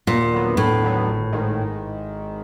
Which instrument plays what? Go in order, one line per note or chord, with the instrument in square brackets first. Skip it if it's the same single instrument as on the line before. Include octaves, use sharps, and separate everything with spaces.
[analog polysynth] D#2 [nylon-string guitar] A#2
[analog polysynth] D3 F#3 B3
[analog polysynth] D#2 [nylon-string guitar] A2
[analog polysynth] D3 F#3 B3
G#1
G#2 D#3